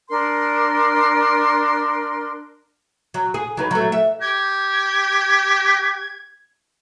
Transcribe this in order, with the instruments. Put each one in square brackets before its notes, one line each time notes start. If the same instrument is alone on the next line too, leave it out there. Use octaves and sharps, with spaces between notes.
[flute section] D4 A#4 C6
[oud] F#3
G#4
F#3 D#4 B4
F#3 A3
E5
[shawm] G4 [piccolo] G#6